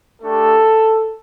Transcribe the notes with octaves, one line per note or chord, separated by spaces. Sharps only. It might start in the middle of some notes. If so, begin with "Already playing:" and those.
A3 D4 G4 A4